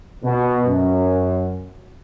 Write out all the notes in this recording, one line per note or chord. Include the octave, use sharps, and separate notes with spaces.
B2
F#2